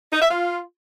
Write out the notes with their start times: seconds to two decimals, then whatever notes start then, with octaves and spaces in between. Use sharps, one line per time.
0.13 D#4
0.22 E5
0.31 F4